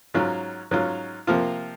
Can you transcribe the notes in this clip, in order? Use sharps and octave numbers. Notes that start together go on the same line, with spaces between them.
G#2 F#3 C#4 F4
G#2 F#3 C#4 F4
C3 F3 A#3 F4